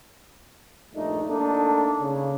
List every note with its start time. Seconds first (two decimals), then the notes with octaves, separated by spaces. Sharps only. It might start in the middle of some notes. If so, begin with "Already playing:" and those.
0.95 A#1 G2 A3 D4 D#4
1.28 A3 A#3 D4 D#4 A4
2.01 C#3